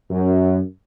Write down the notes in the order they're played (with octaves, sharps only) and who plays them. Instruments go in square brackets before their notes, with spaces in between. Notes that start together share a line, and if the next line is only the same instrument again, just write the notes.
[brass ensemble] F#2